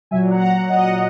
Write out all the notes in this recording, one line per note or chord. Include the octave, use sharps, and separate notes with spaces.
A#2 F#3 E5 G#5
F#5 A#5
D#5 F#5